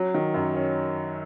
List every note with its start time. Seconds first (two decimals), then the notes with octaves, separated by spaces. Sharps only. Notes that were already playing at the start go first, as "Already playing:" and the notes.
Already playing: F#3 C#4
0.14 D#3
0.34 F#2
0.55 C#4